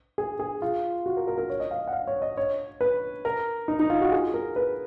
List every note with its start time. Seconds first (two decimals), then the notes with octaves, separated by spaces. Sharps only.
0.18 G#4
0.40 G#4
0.62 F4
1.06 F#4
1.17 A#4
1.27 A#4
1.38 A#4
1.50 C#5
1.60 D#5
1.71 F5
1.88 F#5
1.93 F5
2.07 C#5
2.22 D#5
2.37 C#5
2.81 B4
3.25 A#4
3.68 D#4
3.80 D#4
3.90 F4
4.01 F#4
4.12 G#4
4.34 A#4
4.56 B4